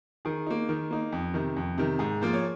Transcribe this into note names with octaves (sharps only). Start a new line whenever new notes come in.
D#3 G#4
A#3 D#4
D#3
A#3 D#4
F2
C3 D#3
F2
C3 D#3
G#2 G#4
F3 A#3 F4
C#5